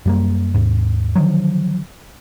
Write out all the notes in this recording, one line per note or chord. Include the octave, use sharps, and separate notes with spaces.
F#2 G3 A#3
D#2 G#2
D3 D#3 F3 F#3